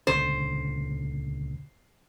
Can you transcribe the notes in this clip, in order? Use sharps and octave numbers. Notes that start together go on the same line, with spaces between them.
D#1 C#2 D3 C5